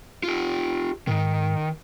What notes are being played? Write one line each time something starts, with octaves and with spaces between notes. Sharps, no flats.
F4 G4
G#2 D#3